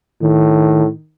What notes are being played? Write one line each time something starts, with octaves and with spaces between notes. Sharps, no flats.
A2 D#3